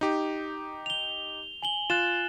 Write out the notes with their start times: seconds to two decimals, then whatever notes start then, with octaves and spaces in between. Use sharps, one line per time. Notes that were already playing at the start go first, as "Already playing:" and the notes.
0.01 D#4 G4
0.86 F7 G7
1.62 G#5 F#7 G7
1.90 F4 F#6 A6 E7